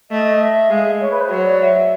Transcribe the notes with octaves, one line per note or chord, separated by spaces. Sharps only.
A3 D#5
E5
G#3 F5
E5
C#5
B4
C5
F#3 C#5
D5
E5